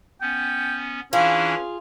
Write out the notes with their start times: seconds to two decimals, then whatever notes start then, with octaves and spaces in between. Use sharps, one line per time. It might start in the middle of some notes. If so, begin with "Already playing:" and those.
0.21 B3 C#4 G5
1.13 E3 C#4 D4 E4 F4 G#4